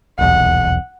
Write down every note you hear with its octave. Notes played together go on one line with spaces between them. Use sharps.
D#1 B1 E2 F#5